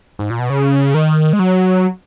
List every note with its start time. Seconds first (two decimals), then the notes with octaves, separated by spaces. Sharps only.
0.19 G#2
0.30 A#2
0.39 B2
0.50 C#3
0.94 D#3
1.33 G#3
1.39 F#3